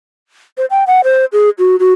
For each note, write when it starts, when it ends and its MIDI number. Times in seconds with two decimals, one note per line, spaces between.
0.58 0.66 72
0.71 0.84 79
0.87 1.01 78
1.04 1.25 72
1.33 1.50 68
1.59 1.76 66
1.80 1.93 66